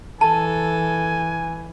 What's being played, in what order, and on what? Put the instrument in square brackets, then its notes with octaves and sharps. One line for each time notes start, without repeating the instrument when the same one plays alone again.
[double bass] E3 [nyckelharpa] A4 [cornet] G#5 [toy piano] A5